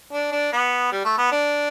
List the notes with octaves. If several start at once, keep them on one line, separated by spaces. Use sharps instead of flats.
D4
D4
B3
G3
A3
B3
D4